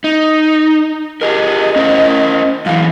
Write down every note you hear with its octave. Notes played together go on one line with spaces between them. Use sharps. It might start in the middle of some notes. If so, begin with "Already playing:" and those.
D#4
G4 G#4 A#4 D#5
C#4 A#4 C5
F#2 E3 F5